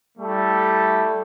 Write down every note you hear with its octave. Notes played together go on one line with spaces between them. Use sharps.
G3 A3 E4 A4